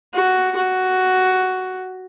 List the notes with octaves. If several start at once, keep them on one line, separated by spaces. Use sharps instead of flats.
F#4
F#4